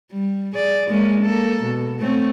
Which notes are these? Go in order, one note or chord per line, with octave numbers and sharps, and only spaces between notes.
G3
G#4 D5
G#3 A#3 C#4
A#3 A4
B2
A3 C4 C#4